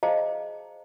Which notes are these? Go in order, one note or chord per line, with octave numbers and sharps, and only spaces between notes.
G#4 C5 D#5 F5 A5 A#5